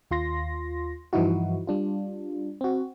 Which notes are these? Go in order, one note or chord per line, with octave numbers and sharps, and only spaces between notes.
D#2 F4 C6 A#6
G2 E3 F3 D#4 E4 F#4
G3 D4 F4
C4 F#4